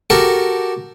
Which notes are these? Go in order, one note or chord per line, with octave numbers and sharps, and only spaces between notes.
F#4 G4 A4 A#4